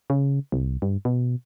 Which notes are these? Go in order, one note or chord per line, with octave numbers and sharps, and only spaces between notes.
C#3
C2
G2
B2